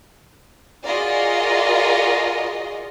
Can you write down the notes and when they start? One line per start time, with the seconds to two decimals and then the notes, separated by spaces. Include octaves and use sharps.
0.84 F4 F#4 G#4 A#4 D5 D#5